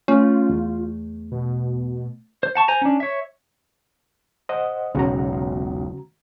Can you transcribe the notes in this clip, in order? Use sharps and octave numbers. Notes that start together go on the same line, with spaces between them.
A3 C#4 F4
E2
B2
C5
F#5 A5 C#6
C5 G#5 A#5
C#4 D4
C#5 E5
C5 D#5 F#5
E1 B1 C#3 F#4 A#5